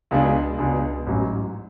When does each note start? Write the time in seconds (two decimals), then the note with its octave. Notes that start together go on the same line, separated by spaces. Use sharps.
0.11 C#2 B2 G#3 D4
0.58 C#2 B2 G#3 D4
1.07 A1 G#2 F#3 C#4